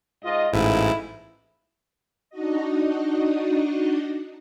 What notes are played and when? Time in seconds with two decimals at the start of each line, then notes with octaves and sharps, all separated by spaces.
0.23 G#2 F4 D#5
0.53 A1 G#2 B2 A3 E4 F4
2.30 D4 D#4 F#4 D#5